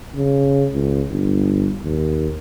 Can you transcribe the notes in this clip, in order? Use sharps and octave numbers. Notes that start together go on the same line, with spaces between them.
C#3
C#2
G1
D#2